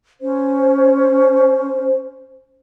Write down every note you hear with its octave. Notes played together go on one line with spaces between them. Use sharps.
C#4 C5